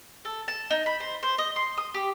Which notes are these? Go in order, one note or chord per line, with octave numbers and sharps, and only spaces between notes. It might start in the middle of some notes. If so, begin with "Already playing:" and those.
A4
A5
D#4
B5
C5
C5
D#5
C6
D#6
G4